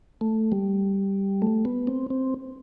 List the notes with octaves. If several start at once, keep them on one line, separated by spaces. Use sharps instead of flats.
A3
G3
A3
B3
C4
C4